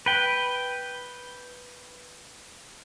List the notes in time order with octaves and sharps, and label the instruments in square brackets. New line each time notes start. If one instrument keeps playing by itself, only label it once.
[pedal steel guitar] B4 G5